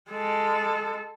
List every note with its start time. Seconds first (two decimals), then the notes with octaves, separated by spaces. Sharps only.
0.11 G#3 A4